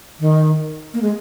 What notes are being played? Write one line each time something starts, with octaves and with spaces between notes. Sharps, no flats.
D#3
A#3
G#3